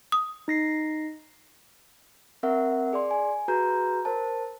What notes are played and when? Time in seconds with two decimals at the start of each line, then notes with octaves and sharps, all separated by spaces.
0.12 D#6
0.48 D#4 A#6 C7
2.43 C4 A#4 E5 F#5
2.93 G#4 D5 C6
3.11 G#5
3.48 F#4 G#4 B4 A#5 G6
4.05 A#4 C5 A5